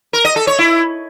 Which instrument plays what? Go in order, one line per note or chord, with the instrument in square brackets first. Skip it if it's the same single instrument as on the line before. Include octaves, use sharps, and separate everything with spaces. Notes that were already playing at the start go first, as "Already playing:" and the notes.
[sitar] A#4
D#5
A4
C#5
E4